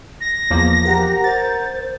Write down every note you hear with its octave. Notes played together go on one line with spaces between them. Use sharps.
A#6
E2 F3 A#3
G4 A#4 F#5 A#5
C5 A6